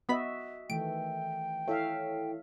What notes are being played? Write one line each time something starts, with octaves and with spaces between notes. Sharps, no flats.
B3 F#4 D#5 E5 B5 B6
D#3 E3 A3 G5 D7
E4 A4 C#5 E5 F5